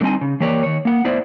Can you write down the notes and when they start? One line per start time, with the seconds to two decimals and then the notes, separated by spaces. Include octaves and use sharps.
0.01 D3 G3 C4 D#4 G#5
0.21 C#3
0.40 E3 A#3 G4 C#5 D5
0.63 D#3 C#5
0.85 A#3 F#5
1.04 A2 B3 E4 C5 D5